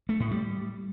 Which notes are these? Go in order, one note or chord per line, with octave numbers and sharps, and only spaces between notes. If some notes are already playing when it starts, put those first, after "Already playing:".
A3
A2
G3